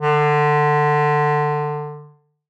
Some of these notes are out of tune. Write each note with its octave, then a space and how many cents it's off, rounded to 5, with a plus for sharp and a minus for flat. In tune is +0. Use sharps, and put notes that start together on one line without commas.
D3 +20